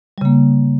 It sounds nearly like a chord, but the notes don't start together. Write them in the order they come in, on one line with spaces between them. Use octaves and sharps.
G3 C#3 A#3